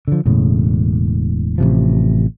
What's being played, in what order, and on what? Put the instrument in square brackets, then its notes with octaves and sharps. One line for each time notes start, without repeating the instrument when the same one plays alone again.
[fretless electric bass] D3 F3
E1 A2 C#3
A1 C3 F3